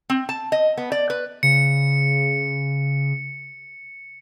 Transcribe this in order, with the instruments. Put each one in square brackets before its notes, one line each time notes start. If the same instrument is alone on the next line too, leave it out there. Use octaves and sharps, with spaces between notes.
[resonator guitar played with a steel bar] C4
A5
D#5
B3
D5
B4
[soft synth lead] C#3 [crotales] C#7